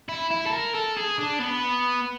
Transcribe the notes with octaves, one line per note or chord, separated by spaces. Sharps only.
E4
E4
A4
A#4
A4
G#4
D4
B3